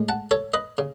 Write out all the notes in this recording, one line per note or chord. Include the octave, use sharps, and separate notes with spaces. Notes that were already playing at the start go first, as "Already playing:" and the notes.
Already playing: A2 G#3
F#5 A5
A4 C#5
B4 D#5
C#3